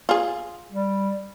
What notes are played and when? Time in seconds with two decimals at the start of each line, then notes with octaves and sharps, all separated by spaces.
0.09 F4 G#4
0.72 G3